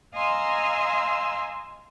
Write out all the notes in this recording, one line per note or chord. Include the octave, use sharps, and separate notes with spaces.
D#5 F5 G#5 A#5 C6 E6